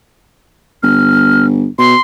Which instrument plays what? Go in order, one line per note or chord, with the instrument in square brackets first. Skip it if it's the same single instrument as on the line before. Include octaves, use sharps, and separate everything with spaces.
[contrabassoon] G1 [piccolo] F6
[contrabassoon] B2 [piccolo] C6